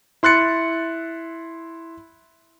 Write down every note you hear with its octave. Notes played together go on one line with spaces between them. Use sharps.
E4 C6 F#6 A6 C#7